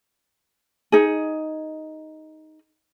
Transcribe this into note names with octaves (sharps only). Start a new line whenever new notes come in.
D#4 G#4